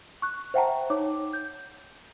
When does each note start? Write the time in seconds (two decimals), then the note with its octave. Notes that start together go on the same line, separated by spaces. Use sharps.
0.22 C#6 F#6
0.54 C5 E5 F#5 G5 A5 A#5
0.90 D#4 C#5 D6
1.33 G6